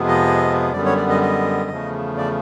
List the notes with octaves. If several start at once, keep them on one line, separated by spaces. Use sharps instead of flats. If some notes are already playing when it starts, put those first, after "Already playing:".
Already playing: F2 C3 F3 G#3 B3
D#5
F#2 D3 G3 B3 D5
C#5
D5
D#5
D#5
E2 C#3 F3 A3
D5